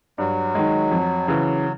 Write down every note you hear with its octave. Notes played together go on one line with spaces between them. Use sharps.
G2 F#3
D#3 G#3
F2
C#3 E3